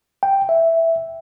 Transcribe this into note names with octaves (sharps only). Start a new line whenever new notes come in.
G5
E5